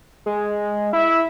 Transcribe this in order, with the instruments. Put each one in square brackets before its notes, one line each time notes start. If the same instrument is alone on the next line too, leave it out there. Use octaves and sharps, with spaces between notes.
[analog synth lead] G#3
[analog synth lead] E4 [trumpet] E5